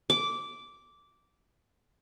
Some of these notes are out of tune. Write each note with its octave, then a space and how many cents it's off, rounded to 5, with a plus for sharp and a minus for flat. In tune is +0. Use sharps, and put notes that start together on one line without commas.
D6 -10